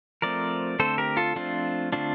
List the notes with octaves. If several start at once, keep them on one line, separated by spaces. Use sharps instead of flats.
F3 A3 C4 A#4 D5
D3 A3 C4 A4 C5
G4 A#4
F4 A4
F3 A3 C4 D4 F4
D3 A3 C4 D4 F4